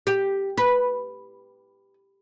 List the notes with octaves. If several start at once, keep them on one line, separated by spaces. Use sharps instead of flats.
G4
B4